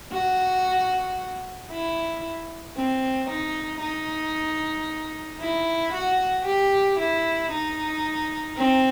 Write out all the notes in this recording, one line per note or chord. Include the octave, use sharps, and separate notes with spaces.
F#4
E4
C4
D#4
D#4
E4
F#4
G4
E4
D#4
C4